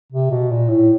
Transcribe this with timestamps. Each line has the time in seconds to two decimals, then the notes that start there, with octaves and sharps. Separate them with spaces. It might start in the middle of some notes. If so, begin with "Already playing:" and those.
0.12 C3
0.31 B2
0.50 A#2
0.69 A2